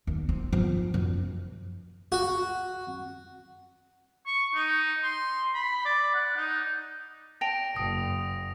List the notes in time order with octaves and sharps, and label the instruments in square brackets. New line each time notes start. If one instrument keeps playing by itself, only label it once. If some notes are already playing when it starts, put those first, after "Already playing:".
[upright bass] D#2
C4
F3
F#2
[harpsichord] F#4
[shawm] C#6
D#4
C6
B5
D5
F#5
D#4
[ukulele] D5 G5 A5 [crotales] A#6 D7 F7
[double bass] F#1 [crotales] D#6